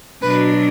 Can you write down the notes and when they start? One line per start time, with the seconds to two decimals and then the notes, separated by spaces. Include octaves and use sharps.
0.22 B2 F#3 D4 B4